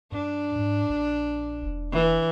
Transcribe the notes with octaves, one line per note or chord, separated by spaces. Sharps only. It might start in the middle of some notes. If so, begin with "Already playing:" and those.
G2 D4
G#2
A#1
E1
E3